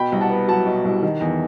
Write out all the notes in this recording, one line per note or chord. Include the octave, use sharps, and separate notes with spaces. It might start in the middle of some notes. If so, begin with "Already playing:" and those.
Already playing: B2 G5 B5
C2
F#5 A5
B3
F#3 F#5 A5
B2
C2
D#3
E2